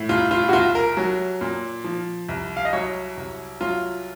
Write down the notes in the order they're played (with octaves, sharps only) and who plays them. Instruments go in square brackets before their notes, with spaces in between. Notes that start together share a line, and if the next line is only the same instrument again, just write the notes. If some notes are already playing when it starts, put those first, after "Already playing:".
Already playing: [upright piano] A2
C2 F4
F4
F#4
C2 F4
A#4
F#3
A#2
F3
C2
F5
D#5
F#3 C#5
C2
F#3 F4